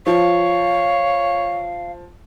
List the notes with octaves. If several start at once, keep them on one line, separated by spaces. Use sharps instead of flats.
F3 C#5 F5